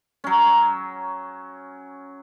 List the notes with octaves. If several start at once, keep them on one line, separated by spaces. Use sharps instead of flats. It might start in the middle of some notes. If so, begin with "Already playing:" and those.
F#3 C#4